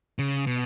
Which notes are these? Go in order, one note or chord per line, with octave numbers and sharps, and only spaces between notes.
C#3
B2